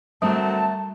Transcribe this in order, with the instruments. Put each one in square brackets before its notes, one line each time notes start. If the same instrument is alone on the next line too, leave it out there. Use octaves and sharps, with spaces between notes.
[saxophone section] D3 F#3 C4 [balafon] G3 [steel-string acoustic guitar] A3 A#4 [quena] A5